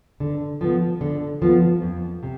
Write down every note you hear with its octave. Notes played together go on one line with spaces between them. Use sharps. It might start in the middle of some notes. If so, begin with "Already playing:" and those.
D3
F3 B3
D3
F3 B3
F2
C3